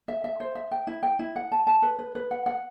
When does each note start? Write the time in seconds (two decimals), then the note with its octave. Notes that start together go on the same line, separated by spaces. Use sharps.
0.08 E5
0.24 E5
0.40 C5
0.55 E5
0.71 G5
0.87 E4
1.03 G5
1.19 E4
1.36 F#5
1.52 A5
1.67 A5
1.82 B4
1.99 B4
2.15 B4
2.31 F#5
2.46 F#5